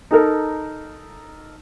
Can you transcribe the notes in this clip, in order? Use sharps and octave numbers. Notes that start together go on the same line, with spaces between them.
D#4 A4 A#4